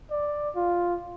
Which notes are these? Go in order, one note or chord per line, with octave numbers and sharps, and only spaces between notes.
D5
F4